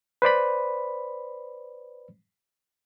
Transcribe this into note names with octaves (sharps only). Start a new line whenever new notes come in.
B4 C5 D5 B5